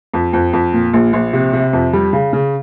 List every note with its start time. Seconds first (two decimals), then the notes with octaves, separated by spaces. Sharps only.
0.14 F2
0.33 F2
0.53 F2
0.73 A#2
0.93 A#1
1.13 A#1
1.33 C3
1.53 C3
1.73 F2
1.93 G3
2.13 C#3
2.33 C#3